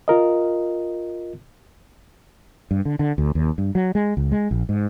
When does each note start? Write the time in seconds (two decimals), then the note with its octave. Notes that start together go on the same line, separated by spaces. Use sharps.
0.08 F4 A#4 D#5
2.71 G2
2.85 D3
2.99 D3
3.18 D2
3.35 D#2
3.58 G2
3.75 F#3
3.95 G#3
4.17 C#2
4.32 G#3
4.51 A#1
4.69 G#2